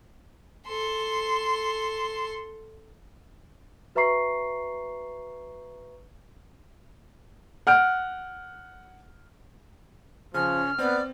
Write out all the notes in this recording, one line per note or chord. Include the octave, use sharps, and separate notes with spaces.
A4 C6
F#4 B4 E5 A#5 C#6 C7
F#5 F6 G6 D7
C#3 F3 C#4 F6
B3 C4 D5